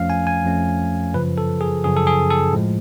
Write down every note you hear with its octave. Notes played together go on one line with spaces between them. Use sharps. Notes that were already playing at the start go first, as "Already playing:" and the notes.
Already playing: F2 F3 A3 C#4 F5
G#5
G#5
F2 F3 A3 C#4
F#2 C#3 F3 B4
A4
G#4
F#2 C#3 F3 G#4
A4
G#4
A4
A2 F3 G#3